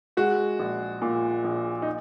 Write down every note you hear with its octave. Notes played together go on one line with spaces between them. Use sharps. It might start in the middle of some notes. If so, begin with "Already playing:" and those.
G#3 F#4
A#1
A#2
A#1
D#4